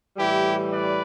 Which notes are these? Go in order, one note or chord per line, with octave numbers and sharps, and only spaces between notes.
A2 E3 G3 E4 G4
B4 D5